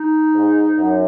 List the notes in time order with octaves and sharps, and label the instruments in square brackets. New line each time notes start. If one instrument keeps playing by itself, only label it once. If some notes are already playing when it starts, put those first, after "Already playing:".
Already playing: [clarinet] D#4
[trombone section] G#2
F#2